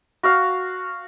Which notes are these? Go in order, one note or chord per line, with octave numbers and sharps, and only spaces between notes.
F#4 F5